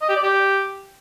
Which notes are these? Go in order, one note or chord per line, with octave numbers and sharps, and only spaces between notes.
D#5
G4
D5
G4